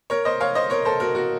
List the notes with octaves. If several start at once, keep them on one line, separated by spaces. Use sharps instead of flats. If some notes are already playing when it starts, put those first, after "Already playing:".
A#4 C#5
C5 D#5
C#5 F5
C5 D#5
A#4 C#5
A4 C5
F#4 A#4
F#4